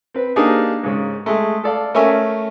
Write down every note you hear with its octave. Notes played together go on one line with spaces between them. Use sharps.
C4 B4
A#3 D4 D#4 G4 G#4
G#2 C#3
G#3 A3
A4 D5 F5
A3 C#4 A#4 C#5 E5 G#5